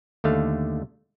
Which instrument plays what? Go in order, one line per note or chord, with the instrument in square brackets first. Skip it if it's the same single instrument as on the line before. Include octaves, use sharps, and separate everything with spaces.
[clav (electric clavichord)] D#2 D3 A3 F5